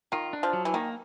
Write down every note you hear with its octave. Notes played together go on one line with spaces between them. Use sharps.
D#3 F4
D4
F3
F#3
E3
D#3 A#3